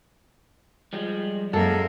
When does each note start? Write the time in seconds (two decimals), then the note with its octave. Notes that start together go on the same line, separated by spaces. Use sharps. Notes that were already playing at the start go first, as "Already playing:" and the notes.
0.93 F3 G3 G#3
1.53 F#2 G#3 A#3 A4